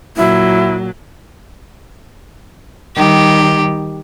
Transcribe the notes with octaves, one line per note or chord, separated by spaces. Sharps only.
A#2 F#3 E4
D#3 G3 G4